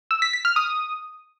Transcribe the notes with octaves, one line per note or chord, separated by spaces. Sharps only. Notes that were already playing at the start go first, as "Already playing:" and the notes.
E6
B6
B6
F6
D#6